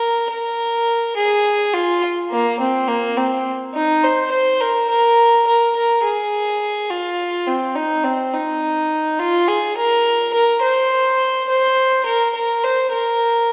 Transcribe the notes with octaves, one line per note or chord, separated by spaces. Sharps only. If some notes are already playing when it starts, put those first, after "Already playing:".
Already playing: A#4
A#4
G#4
F4
A#3
C4
A#3
C4
D#4
C5
C5
A#4
A#4
A#4
A#4
G#4
F4
C4
D#4
C4
D#4
F4
G#4
A#4
A#4
C5
C5
A#4
A#4
C5
A#4